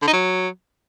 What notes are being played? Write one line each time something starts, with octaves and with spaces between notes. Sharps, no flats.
D3
D#4
F#3